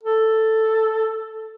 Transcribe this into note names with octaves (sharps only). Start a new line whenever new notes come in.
A4